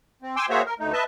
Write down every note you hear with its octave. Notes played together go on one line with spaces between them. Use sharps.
C4
G5 G#5 C6 D6 E6
A#3 F#4 G#4 C5 C#5 E5
A#4
D2 A3 D#4
B4 D#5 E5 A5